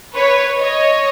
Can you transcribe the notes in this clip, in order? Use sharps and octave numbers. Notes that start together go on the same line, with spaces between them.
B4 C#5
C#5 D#5